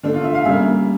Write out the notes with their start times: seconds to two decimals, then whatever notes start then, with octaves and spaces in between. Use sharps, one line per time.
0.03 D3 A3 D4
0.14 F4
0.24 E5
0.34 F5
0.45 C#3 G3 A#3 E5